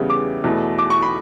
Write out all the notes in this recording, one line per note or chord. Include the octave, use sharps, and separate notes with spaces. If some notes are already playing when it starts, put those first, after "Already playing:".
Already playing: E2 C#3 G3 B3 E4
D6
E2 B2 A3
D6
C#6
B5